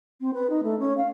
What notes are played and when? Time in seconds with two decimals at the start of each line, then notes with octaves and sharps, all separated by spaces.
0.21 C4
0.33 B4
0.50 D#4
0.63 A3
0.79 C#4
0.97 F5